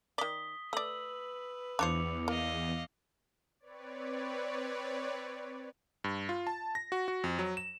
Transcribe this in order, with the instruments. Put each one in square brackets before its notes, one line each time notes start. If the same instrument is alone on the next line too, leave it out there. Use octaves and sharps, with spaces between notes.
[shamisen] D#3 D5 [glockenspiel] D#6 B6 G7
[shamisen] A3 D5 [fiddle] B4 [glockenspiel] E6 F#7
[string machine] E2 [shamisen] D4 F4 C5 [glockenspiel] D6 C#7 F7
[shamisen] A#3 [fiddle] D#5 F5
[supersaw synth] C4 B4 C#5 D5
[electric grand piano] G2
F4
A5
A#6
F#4
F#4
F2
F#3
E7